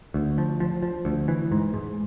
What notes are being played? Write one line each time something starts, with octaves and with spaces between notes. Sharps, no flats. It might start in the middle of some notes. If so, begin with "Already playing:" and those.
D2
F3
F3
F3
D2
E3
G#2
G#2